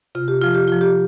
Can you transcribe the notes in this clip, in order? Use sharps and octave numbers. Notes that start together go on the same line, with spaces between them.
C3 F4
G4
F3 F4
G4
F3 F4
G4